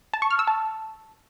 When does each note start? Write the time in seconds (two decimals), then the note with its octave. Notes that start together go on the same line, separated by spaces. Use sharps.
0.14 A5
0.22 C#6
0.31 F6
0.39 E6
0.48 A5